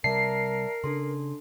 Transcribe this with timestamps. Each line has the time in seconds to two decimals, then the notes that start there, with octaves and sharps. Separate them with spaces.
0.04 C3 G3 A#4 D5 E5 A5 C7
0.84 C#3 D4 A4 C6